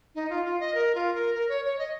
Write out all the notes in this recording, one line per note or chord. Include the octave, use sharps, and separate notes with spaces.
D#4
F4
F4
D#5
A#4
F4
A#4
A#4
C#5
C#5
D#5